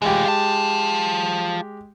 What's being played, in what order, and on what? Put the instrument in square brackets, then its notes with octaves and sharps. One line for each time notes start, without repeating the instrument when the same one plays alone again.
[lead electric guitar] E3 F4 [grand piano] G#3 G4
[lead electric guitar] F4 A5